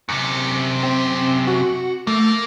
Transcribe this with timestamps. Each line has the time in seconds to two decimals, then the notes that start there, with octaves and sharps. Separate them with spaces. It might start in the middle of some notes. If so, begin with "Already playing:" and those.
0.09 F#2 C3 C#7
0.83 C4
1.47 F#4
2.07 A3 A#3